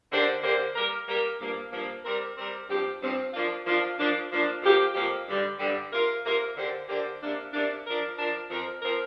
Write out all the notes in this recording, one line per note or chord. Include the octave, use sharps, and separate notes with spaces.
D3 A#3 D4 G4 C5
D3 A#3 D4 G4 C5
G3 A#3 G4 A#4
G3 A#3 G4 A#4
G2 F3 A#3
G2 F3 A#3
G3 C4 A#4
G3 C4 A#4
G2 F3 C4 G4
G2 F3 C4 G4
F3 A#3 D4 F4
F3 A#3 D4 F4
F3 A#3 D4
F3 A#3 D4
F2 F3 A#3 G4
F2 F3 A#3 G4
G2 D3 G3
G2 D3 G3
C3 A#3 F4 A#4
C3 A#3 F4 A#4
D3 A#3 D4 G4 C5
D3 A#3 D4 G4 C5
C3 A#3 D4
C3 A#3 D4
F3 D4 A#4
F3 D4 A#4
F2 F3 C4 A#4
F3 C4 A#4